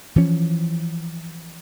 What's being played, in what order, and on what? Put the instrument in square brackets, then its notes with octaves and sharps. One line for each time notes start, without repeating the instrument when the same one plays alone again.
[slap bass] E3 F3 C#4